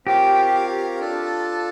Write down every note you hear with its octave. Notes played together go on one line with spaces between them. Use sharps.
C4 F4 G4 A#4 C#5 F5
D4 F4 A4